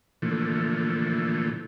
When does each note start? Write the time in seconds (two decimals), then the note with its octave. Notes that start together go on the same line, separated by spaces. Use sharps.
0.22 A#2 D3 E3 F3 A3